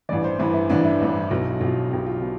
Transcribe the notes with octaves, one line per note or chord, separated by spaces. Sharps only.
A1 G2 E3 D5
C5
A1 G2 E3 E4
E4
A1 G2 E3 D4
E4
A1 G2 E3
B1 B2
B1 B2 F4
B1 B2 G4
F4
B2